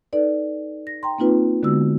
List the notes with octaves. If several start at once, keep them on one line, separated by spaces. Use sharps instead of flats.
D#4 A4 B4 D5
A#6
G5 A#5 C6
A#3 C4 D#4 F4 B4
D3 G#3 B3 F#4 E6